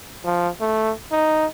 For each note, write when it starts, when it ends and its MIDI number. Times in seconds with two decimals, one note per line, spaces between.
0.25 0.49 53
0.61 0.92 57
1.12 1.46 63